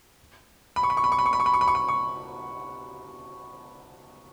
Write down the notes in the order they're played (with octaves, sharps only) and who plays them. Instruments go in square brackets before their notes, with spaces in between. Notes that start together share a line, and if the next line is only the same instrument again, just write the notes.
[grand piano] B5
C#6
B5
C#6
B5
C#6
B5
C#6
B5
C#6
B5
C#6
B5
C#6
B5
C#6